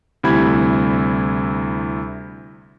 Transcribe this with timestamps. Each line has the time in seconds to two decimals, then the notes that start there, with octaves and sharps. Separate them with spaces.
0.24 D2 C3 G3 E4 B5 G#6